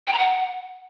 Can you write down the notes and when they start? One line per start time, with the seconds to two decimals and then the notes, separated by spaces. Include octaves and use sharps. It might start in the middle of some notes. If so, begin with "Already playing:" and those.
0.07 G5
0.13 A#5
0.18 F#5